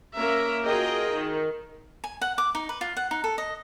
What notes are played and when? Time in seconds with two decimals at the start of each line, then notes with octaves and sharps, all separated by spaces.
0.17 A#3 C#4 A#4 E5 A#5
0.65 F4 F#4 G#4 A#4 D#5 G5
1.12 D#3
2.04 G#5
2.21 F#5
2.38 D6
2.55 D#4
2.69 B4
2.81 F4
2.97 F#5
3.11 D#4
3.24 A4
3.38 D#5